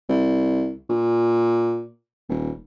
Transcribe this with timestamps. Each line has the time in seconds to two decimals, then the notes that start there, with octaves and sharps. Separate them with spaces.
0.09 C2
0.90 A#2
2.29 D#1